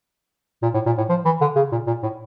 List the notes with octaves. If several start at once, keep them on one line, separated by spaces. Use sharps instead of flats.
A#2
A2
A#2
A2
F3
E3
D3
C#3
A#2
A#2
A2